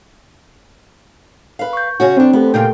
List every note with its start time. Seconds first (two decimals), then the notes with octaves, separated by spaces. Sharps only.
1.59 B4 F5
1.73 C#6 G6
2.00 C#3 C#4 F#4
2.17 F2 C4 D4
2.33 A3 B3 G4 A4
2.54 A#2 C#3 F4 G5